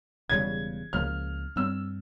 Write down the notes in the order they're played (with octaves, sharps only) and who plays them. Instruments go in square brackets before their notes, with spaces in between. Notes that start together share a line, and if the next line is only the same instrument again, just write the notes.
[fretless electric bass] E1 E2 C#3 G3 [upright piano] G#6
[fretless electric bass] C#2 C#3 F3 A#3 [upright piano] F6
[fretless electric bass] G2 G3 C4 [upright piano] E6